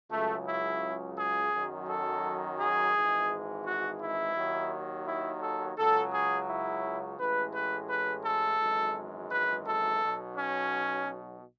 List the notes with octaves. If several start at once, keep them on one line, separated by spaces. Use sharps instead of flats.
C#2 C#3 F#3 A3
E4
G#4
F#2 D#3 F#3
A4
G#4
G#1 G#2 E3 G#3
F#4
E4
D#2 D#3 F#3
E4
A4
C#2 C#3 F#3 A4
G#4
E4
A1 A2 G#3 B4
B4
B4
A4
G#1 F#2 E3 G#3
B4
A4
B1 B2 F#3
C#4